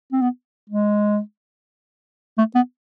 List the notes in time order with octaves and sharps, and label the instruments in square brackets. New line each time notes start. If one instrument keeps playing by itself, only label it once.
[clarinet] C4
B3
G#3
A3
B3